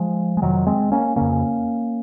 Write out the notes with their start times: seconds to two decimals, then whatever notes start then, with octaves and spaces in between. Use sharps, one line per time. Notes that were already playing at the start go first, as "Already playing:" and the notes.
Already playing: F3 G#3
0.37 G#3
0.42 F2 C3 D#3 F#3
0.67 G#3 C4
0.92 A#3 C#4
1.16 F2 C#3 A#3 C#4